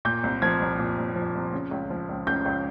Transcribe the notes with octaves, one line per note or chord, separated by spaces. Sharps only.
A#2 G6
C2
F3 G#6
C2
A#2
C2
F3
C2
C#3
C#2
F3
C#2
C#3 G6
C#2